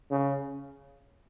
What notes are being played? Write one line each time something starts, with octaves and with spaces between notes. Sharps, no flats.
C#3